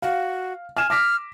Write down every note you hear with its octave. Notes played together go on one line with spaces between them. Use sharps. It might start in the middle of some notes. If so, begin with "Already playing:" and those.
F#4 F5
G#5 F6 E7
D6 F6 A#6 B6